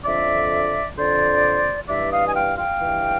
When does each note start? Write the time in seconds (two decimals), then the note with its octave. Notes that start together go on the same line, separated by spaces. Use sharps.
0.05 F2 D3 D5 E5
0.97 F2 D3 C5 D5
1.89 G2 E3 D5 E5
2.11 D#5 F5
2.27 G#5
2.35 F5 G5
2.58 F5 G5
2.81 G2 E3